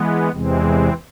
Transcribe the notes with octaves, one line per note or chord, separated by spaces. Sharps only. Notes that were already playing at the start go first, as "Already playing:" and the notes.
Already playing: E3 G#3 B3
E2 C3 E3 G#3 C4